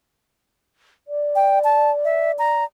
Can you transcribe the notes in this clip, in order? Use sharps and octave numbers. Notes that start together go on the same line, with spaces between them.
D5
G5
A5
E5
A#5